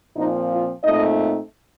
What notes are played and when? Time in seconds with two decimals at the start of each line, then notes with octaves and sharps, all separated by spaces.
0.16 A#2 F3 C4 D#4
0.50 F4
0.83 A#2 A3 C4 D#4 D#5